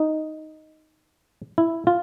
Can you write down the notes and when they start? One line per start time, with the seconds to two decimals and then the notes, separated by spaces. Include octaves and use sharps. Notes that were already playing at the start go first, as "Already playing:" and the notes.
Already playing: D#4
1.58 E4
1.87 F4